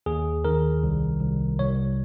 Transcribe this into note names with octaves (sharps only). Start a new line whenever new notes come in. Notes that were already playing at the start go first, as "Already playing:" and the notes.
D#2 G#4
D#3 A#4
C2
C2
C2 C#5